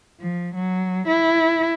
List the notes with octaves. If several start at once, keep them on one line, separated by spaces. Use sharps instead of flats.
F3
F#3
E4